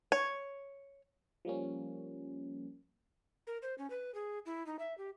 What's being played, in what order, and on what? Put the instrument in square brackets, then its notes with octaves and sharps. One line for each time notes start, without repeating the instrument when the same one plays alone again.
[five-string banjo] C#5
[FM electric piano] F3 G3 A#3 C#4
[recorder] A#4
C5
C#4
B4
G#4
E4
D#4
E5
G4